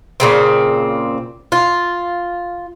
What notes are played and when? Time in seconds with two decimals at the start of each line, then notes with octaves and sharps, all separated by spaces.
0.20 A#2 C#3 C4
1.52 F4